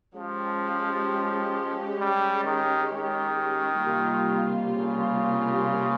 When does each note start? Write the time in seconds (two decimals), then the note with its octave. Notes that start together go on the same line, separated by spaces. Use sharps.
0.15 F3 G#3 C#4 G4
1.99 G3
2.45 D#3
2.91 D#3
3.83 C3 G3 A#3 F4
4.74 C#3